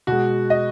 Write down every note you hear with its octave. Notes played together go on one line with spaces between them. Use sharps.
B2 G#3 F#4
D#5